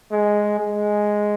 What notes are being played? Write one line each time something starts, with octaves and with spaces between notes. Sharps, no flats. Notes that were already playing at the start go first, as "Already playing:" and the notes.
G#3
G#3